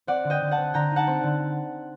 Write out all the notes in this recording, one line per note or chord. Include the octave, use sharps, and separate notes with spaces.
C4 D5 F#5
D3
D#5 G5
D3
F#5 A5
C4
D3 G5 A#5
D#4
F#5 A5
C4
D3